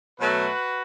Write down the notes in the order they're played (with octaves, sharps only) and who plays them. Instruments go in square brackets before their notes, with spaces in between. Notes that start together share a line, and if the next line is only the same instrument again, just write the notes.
[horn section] B2 F#3 A3 F#4 B4